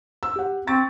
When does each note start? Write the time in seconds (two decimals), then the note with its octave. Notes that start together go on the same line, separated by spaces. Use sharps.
0.23 E6
0.36 G4 F#5
0.67 C4 C#6 A6 D7